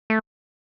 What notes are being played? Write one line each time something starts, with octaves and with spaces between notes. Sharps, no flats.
A3